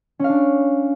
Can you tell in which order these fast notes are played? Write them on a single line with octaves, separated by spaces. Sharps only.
C#4 F5 D4